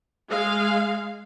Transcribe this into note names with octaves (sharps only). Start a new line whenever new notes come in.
G#3 F5